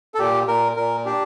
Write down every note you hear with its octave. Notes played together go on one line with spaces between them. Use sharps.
A4
A#2 G4
A#2 A#4
A#2 A#4
D4 G4